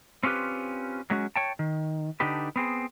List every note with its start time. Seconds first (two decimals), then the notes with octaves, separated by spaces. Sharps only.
0.23 C4 C#4 F4 G4 B4
1.10 F#3 G#3 C#4 F#4
1.36 C#5 G5 A5
1.59 D#3
2.20 D3 D4 D#4 G4 B4
2.56 B3 C4 G#4